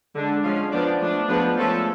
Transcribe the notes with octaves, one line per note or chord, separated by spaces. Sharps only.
D3 G#3 D4
F3 G#3 C#4 F5
F3 B3 D4 D5
F3 A3 D4
F3 G#3 B3 D4 B4
F3 A3 C#4 A4